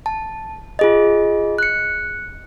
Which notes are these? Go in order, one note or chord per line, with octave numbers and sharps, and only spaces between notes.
A5
F4 G#4 D#5
F#6 C#7